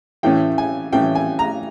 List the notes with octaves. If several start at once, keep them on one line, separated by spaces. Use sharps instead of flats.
A2 E3 A3 C#4 G5
G#5
A2 E3 A3 C#4 G5
G#5
A#5